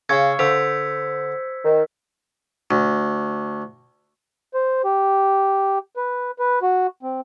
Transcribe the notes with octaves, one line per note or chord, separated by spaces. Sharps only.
C#3 F5 C#6 E6 G#6 C#7
D3 C5 E6 B6
D#3
D2
C5
G4
B4
B4
F#4
C4